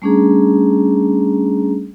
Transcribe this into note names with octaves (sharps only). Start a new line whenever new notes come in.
G3 A3 C#4 D4 G#4 A#5